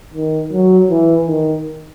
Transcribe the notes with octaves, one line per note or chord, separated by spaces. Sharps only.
D#3
F#3
E3
D#3